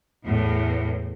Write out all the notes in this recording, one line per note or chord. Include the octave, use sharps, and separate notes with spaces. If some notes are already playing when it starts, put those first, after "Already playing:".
E2 A2